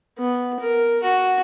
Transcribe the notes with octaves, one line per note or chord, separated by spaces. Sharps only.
B3
A#4
F#4